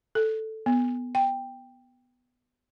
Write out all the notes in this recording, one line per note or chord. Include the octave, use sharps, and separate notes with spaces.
A4
B3
G5